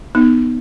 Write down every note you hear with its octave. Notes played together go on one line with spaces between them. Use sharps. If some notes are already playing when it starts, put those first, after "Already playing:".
B3 D#4